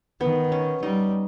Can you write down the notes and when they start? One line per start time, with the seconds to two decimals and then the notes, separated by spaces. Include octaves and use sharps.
0.21 D#3 B3
0.52 C#4
0.82 G3 D#4